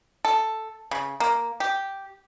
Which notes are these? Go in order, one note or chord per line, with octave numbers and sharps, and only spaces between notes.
A4
C#3
A#3
G4